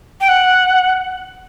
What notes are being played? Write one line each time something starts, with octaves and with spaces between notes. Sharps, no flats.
G5
F#5